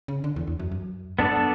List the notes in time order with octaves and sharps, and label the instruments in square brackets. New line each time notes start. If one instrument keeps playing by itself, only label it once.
[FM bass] C#3
D3
E2
E2
F#2
F#2
[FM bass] F#2 [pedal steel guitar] B3 D4 A4 D5